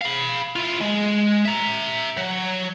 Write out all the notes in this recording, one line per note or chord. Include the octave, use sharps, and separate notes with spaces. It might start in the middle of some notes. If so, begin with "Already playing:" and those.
F5 B5
E4 F4
G#3
E5 A#5
F#3